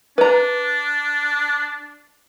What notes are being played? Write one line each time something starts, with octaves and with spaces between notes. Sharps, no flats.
D4 B4 A#5